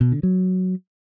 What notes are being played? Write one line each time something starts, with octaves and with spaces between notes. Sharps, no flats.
B2
D3
F#3